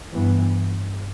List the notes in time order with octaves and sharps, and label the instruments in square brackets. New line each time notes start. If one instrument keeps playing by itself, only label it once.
[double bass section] G2 E3 B3